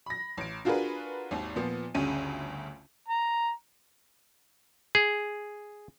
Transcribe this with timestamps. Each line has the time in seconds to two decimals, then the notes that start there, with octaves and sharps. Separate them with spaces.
0.06 B5 A#6
0.37 A1 D7
0.65 D4 F4 F#4 G#4 A#4 B4
1.31 G#1 D#2
1.56 A#2 F3 B3
1.94 G1 D2 C#3 C#4 D#7
3.09 A#5
4.95 G#4